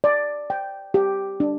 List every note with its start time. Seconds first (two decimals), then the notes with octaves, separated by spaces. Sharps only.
0.04 D5
0.50 G5
0.94 G4
1.40 D4